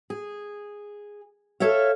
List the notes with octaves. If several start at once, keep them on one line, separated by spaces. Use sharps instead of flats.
G#4
A4 C#5 E5 F5